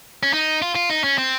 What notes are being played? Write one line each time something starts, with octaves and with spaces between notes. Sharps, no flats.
C#4
D#4
F4
F4
D#4
C#4
C4